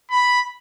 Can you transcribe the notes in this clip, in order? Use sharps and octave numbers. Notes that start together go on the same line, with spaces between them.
B5